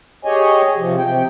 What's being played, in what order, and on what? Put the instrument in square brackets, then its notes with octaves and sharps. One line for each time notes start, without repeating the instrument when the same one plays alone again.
[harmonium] G4 G#4 C#5 D#5 G#5
C3 F3
C3 G5